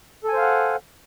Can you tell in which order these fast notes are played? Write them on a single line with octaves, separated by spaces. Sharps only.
A4 G#5 C5 F5 F#5